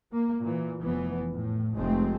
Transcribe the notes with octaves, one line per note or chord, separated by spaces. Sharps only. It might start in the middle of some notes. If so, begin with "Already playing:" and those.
A#3
A#2 E3
F1 E3 B3
A2
F1 G#3 A3 C4